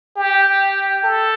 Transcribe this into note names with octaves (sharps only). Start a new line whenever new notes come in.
G4
A4